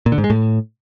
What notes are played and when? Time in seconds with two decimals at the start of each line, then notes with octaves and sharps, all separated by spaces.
0.06 A#2
0.12 D3
0.18 G#2
0.24 G#3
0.30 A2